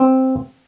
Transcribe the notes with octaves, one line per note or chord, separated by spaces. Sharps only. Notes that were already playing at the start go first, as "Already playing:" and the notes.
Already playing: C4